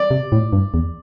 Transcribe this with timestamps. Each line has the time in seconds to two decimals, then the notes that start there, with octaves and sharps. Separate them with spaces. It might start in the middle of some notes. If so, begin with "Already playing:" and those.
Already playing: D5
0.11 C3
0.32 A2
0.53 G2
0.74 E2